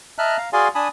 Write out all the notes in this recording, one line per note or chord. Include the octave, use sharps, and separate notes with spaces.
D#5 E5 A5 A#5 F6 F#6
F5 A#5
F#4 G#4 D5 F5 G#5 C6
D4 G#5 A5 B5 D#6